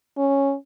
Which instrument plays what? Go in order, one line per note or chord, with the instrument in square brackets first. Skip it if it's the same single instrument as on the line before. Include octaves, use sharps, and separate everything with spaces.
[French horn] C#4